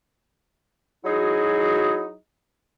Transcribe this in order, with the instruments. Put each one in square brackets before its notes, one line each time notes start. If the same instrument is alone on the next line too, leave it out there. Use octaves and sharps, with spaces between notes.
[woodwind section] F#3 D#4 E4 F#4 G#4